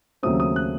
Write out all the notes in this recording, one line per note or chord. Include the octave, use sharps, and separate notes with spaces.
D#2 C#3 F#3 A3 C4 D#6
D#6
F#6